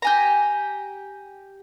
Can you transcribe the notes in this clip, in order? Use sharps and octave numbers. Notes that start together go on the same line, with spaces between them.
G4 G#5 A#5